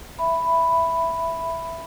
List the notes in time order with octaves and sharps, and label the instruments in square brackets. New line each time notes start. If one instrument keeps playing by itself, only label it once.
[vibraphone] E5 B5